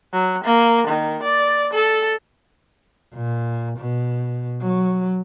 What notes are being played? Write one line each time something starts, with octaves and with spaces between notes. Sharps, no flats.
F#3
A#3
D#3
D5
A4
A#2
B2
F#3